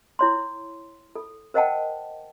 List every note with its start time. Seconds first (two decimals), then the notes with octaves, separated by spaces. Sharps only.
0.19 E4 C#5 C6
1.15 A4
1.54 A#4 C5 D#5 F#5 G5 A5